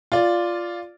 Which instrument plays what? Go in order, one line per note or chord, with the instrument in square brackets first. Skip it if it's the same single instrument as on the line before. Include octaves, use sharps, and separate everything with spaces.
[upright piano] F4 D5